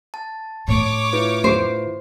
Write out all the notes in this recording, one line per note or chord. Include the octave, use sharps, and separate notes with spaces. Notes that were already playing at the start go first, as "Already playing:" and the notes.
A5
A2 D3 C#5 D6
E4 F4 B4
C5